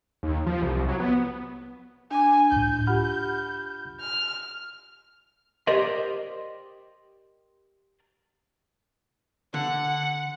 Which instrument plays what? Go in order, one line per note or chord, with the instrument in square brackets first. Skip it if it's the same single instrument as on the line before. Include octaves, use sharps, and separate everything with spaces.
[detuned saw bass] D#2
F3
C2
F#3
B3
[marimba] D4 D6 [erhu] G#5
[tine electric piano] C#2 A2 [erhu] G6
[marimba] F4 G4 F#5 [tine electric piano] B5 F6
[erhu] F6
[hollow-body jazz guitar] G4 A#4 C5 D5 D#5
[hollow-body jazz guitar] D3 [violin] F#5